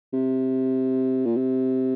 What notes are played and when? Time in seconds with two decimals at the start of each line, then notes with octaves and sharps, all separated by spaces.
0.13 C3
1.25 A#2
1.36 C3